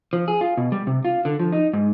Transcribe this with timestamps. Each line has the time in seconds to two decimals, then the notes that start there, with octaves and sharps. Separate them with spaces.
0.13 F3
0.28 G#4
0.41 F4
0.57 B2
0.72 G3
0.87 C3
1.05 F4
1.25 D3
1.39 F3
1.52 D#4
1.73 G#2